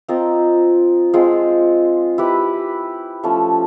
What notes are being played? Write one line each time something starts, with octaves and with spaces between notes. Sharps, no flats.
C4 F4 A#4 D#5
G#3 C4 F4 G#4
E4 G4 B4
F3 A3 C#4